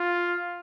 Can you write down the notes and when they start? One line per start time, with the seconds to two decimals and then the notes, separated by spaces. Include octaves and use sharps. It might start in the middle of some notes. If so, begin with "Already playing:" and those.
Already playing: F4